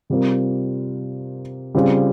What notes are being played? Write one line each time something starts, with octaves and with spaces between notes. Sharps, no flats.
C3 G3 C4 F4 A#4
C#3 G3 C4 F4 G#4